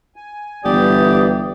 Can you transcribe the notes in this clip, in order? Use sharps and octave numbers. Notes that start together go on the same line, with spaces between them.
G#5
G1 E3 G4 D5 D#6